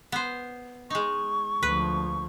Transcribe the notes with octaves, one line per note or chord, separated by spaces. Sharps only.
B3 C5
G#3 D#4 C#6
D2 F3 B4